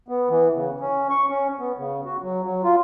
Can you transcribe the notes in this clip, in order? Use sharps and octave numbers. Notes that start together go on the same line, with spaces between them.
B3
E3
C#3
C#4
C#6
C#4
B3
C#3
F#4
F#3
F#3
F4